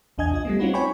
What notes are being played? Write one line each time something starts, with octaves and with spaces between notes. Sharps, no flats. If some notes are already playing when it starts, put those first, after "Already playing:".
A#1 E2 D4 D#5 G#5 G#6
C2 F4 D#5
G3 A3 B3
C4 C#4 D#4 F4 F#4 B4
C#5 G5 G#5 B5 C#6